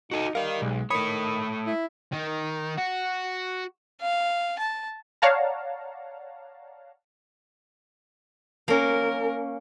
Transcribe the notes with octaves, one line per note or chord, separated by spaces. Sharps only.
D#4 F#4 A4
G3 A#4 D#5 F5
B1 G#3
D#3 A3 C#5 B5 D#6
E4
D#3
F#4
F5
A5
C#5 D5 F5 F#5 A5 A#5
A#3 C#4 A#4